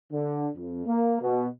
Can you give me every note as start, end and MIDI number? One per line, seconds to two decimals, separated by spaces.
0.12 0.48 50
0.56 0.85 41
0.86 1.19 58
1.21 1.47 47